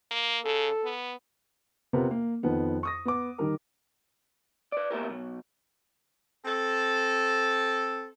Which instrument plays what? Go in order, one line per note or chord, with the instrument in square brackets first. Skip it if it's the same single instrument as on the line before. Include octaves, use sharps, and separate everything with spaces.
[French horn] A#3
[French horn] C#3 [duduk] A4
[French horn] B3
[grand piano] C3 B3 F4 A#4
A#3
F2 D#3 B3
C#6 D#6 A#6
B3 D6
D#3 G3 A#4
[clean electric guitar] B4 D5
A#3 B3 E4 F4 G4 A#4
B2 F#3
[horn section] C4 A4